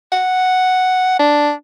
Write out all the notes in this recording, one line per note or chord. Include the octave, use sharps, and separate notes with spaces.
F#5
D4